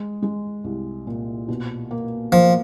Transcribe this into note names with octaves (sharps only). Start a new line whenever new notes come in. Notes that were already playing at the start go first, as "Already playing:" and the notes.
Already playing: G#3
G#3
C2
A#2
B2
A#3
F3 A#3